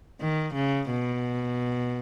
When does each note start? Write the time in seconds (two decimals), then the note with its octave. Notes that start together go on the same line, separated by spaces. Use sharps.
0.20 D#3
0.55 C#3
0.90 B2